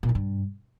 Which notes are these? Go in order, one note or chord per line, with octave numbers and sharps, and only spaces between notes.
A#2
D#3
G2